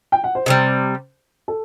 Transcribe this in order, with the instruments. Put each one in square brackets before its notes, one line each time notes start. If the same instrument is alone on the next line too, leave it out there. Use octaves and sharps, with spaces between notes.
[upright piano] G5
F#5
C5
[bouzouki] C3 D#3 G3 [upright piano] C5
[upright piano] A4